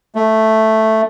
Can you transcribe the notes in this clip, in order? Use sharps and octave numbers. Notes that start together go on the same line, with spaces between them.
A3